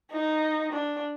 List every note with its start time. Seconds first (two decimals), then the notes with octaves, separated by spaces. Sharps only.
0.12 D#4
0.72 D4